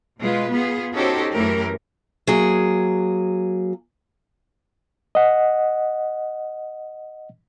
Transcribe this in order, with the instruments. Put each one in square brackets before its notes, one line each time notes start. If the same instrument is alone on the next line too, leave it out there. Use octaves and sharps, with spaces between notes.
[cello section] B2 G#3 F4 B4
B3 F4 G#4
C#4 D#4 F#4 G4 A4 C5
F#2 E3 A3 G4 A#4
[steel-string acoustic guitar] F#3 A#3 G#4
[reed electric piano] D#5 F#5